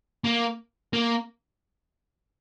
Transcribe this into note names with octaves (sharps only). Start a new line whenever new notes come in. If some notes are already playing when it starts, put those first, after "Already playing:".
A#3
A#3